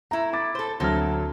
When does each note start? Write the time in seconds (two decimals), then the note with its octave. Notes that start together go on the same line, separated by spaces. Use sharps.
0.11 A3 E4 A#5
0.33 B5 D6 A6
0.55 A4 C5
0.80 D2 F#3 A#3 C4 A4 F6